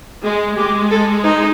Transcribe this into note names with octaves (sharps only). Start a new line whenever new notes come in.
G#3
G#3 G4
A4
D#4